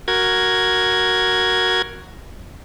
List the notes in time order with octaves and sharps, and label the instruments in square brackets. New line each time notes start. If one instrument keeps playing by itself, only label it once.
[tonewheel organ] F#4 A#4 G#6